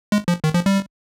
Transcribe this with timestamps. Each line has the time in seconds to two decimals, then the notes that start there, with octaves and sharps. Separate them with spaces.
0.12 G#3
0.28 F3
0.44 D#3
0.54 F3
0.66 G3